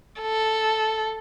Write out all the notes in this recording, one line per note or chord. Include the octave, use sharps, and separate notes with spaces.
A4